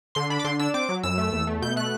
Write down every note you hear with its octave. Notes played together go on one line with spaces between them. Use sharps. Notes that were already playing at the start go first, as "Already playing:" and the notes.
D3 C6
D4 B5
D6
D3 C6
D4 E6
C4 D6
F#3
F#2 E6
A3
E2
A3
B2 G6
A3 F#6